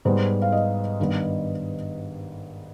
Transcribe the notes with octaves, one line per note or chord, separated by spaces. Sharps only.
G#2 G3 B3 C5
F5
D#5
G2 D#3 G3 B3